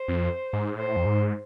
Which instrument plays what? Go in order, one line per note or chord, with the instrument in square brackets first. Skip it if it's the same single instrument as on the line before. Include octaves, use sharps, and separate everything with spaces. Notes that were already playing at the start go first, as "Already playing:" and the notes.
Already playing: [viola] C5
[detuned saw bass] F2
G#2
[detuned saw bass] A2 [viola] C5
[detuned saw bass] F2
G#2